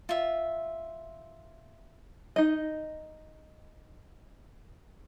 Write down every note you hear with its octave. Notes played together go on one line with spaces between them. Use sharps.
F4 E5
D#4 D#5